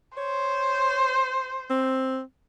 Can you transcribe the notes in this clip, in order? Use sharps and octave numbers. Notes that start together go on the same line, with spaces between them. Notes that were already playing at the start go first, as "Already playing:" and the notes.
C5 C#5
C4